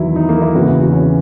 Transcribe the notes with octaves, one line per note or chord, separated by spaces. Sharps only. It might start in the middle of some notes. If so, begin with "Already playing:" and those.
Already playing: E2 D#3 F#3 E4
D#4
A#3
E4
E2 C#3 E3 F#4
F#4
C#4